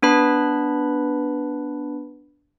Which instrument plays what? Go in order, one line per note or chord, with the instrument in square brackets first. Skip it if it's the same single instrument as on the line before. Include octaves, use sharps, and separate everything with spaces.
[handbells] B3 D4 B4 B5